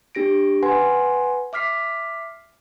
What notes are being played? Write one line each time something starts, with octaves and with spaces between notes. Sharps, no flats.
D4 G4 A#6 D7
B4 F#5 G#5 C6
E5 D6 F6 B6 C7